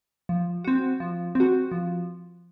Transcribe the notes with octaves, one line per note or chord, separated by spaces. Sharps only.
F3
C4 F#4
F3
C4 F#4
F3